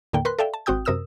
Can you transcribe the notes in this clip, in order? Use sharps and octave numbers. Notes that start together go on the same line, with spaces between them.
D#2 A2 D3 A#3 G5
A#4 B4 C6 F#6
A4 D5 E5 F5 G5
A5
G#1 C4 F#4 G5 D#6 G6
F#2 C3 A#4 D#6 E6 E7